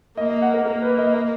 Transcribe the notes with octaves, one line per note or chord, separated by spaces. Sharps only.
A#3 D#5
D#5
F#5
A#4
A#3 A#4
B4
D#5
D#5